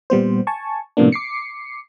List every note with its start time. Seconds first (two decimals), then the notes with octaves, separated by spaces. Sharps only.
0.10 A#2 G3 B3 C5
0.47 G#5 A5 C#6
0.97 A2 C3 F3 A#3 B3 D4
1.12 D6 C7 C#7